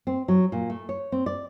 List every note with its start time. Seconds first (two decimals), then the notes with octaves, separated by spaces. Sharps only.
0.07 C4
0.28 F#3
0.52 A#2
0.70 A3
0.89 C#5
1.12 C4
1.26 D5